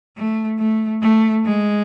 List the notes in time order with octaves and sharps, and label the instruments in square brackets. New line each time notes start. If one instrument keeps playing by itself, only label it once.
[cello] A3
A3
A3
G#3